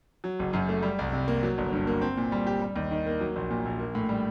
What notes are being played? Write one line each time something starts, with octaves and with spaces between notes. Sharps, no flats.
F#3
F#1
F#2
A3
G3
C2
C3
A#3
F#3
G1
G2
A#3
C4
A#2
G3
G4
G3
D#2
D#3
A#3
F#3
A#1
A#2
A#1
A#3
A2
G3